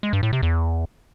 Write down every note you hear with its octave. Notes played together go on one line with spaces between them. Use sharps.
G#3
G2
A2
C3
E2